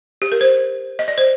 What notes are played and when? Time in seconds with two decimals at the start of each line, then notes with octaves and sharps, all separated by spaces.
0.22 G4
0.32 A#4
0.41 C5
0.99 D#5
1.08 D5
1.18 C5